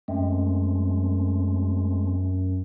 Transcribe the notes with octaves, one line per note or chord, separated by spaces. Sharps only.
F#2 G#3 A3 C4